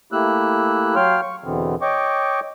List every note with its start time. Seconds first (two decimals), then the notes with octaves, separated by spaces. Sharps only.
0.12 A3 A#3 E4 G4 E6 F#6
0.95 F#3 C#5 F5 G5 C6 F6
1.21 C#6
1.44 E2 B2 D3 E3 B3 C4
1.82 C#5 D#5 G5 C#6 D6